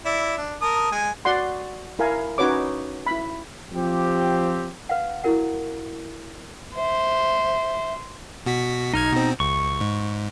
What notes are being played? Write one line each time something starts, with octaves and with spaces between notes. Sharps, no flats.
E4 D5 E5
D4
A#4 A5 D#6
G#3 G#5
F#4 D5 F#5 C6
E4 A#4 F5 G#5
C#4 D#4 F#4 B4 C#5 D6
E4 B5
F3 C4 G4
B4 F5 F#5
E4 F#4 A#4 F#5
C5 E5
B2 F#4 B6
B1 D#4 F6 G#6
B2 C4
C#2 C#6
G#2